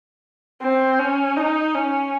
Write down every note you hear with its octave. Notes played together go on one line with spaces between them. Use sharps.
C4
C#4
D#4
C#4